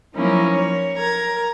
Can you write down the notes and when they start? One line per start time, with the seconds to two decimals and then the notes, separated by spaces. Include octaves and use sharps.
0.14 F3 F#3 A#3 C#4 D#4 E4
0.53 C#5
0.97 A#4 A#5 G#6